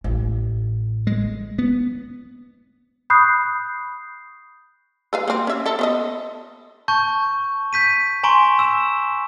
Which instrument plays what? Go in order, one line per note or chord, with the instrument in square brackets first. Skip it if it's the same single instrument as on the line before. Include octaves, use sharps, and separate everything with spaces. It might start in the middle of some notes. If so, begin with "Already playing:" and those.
[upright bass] A1
[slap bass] G#3
B3
[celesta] B5 C#6 D#6 F#6 G6 C7
[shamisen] A4 B4 F5
A#3 C4
C#4 E5
A4 E5
B3 C5 D#5
[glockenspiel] A5 C#6 G6
G6 B6 D#7
G#5 A#5 C6 C#6 D7
E6 E7